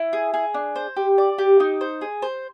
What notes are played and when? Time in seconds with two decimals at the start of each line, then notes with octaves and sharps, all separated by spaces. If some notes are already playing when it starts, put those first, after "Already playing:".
Already playing: E4
0.13 G#4
0.34 G#4
0.54 D4
0.76 C5
0.97 G4
1.18 D5
1.38 G4
1.60 D#4
1.81 C5
2.01 G#4
2.22 C5